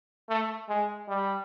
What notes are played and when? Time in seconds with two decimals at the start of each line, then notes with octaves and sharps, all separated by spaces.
0.29 A3
0.69 G#3
1.08 G3